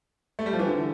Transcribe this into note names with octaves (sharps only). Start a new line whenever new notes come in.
A3
G3
F3
E3
D3